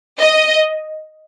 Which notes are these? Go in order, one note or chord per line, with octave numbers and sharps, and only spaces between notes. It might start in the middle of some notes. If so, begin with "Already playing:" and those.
D#5